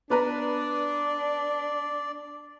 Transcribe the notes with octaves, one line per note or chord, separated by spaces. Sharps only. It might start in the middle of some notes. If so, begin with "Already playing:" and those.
B3 D4 B4 D5 A#5